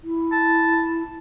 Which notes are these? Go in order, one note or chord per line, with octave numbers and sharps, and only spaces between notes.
E4
A5